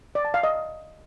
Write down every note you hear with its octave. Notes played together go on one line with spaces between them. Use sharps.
D5
A5
F5
D#5